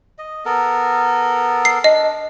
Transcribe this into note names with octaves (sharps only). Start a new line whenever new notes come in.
D#5
B3 A4 A#4
C7
D4 D#5